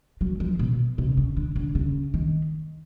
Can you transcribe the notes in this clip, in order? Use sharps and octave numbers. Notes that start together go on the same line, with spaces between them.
F#3
F3
B2
C3
C#3
D3
D3
C#3
D#3